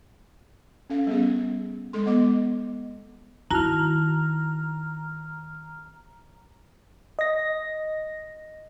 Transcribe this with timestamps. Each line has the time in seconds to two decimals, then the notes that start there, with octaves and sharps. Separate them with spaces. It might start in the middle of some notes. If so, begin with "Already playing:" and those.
0.90 C#4 A4 F5
1.07 G3 B3 C#4 G#4
1.93 G#3 A4 C6
2.06 B3 D#5 D6
3.51 D#3 E4 F#4 A5 A#5 F6
7.19 D#5 A#6